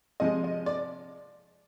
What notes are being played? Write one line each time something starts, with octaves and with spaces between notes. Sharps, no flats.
C3 F3 G#3 D#5
D#5
D5